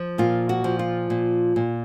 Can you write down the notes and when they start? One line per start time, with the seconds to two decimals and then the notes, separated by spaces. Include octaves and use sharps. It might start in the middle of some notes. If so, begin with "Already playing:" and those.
Already playing: F3
0.18 A#2 F4
0.49 F#4
0.64 F3
0.79 F4
1.10 A#2
1.56 A#2